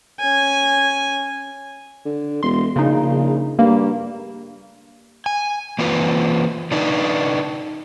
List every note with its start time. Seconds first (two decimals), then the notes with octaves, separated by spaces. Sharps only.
0.20 C#4 G#5
2.05 D3
2.43 E1 C6
2.76 A#1 C#3 D#4
3.59 G2 A#3
5.26 G#5
5.79 E3 A#3 C4 F4 B4
6.71 D3 D4 D#4 B4